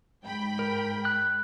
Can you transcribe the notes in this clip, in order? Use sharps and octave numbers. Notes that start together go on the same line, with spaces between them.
G#2 G5 B5
A#4
F#6